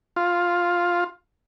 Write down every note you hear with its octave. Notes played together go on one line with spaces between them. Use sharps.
F4